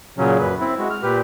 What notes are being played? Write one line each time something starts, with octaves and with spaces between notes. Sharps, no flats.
A#2 C#3 F#3 C#4
F#2 B4
C4 E4
G#3 F#4
F6
A#2 G4 B4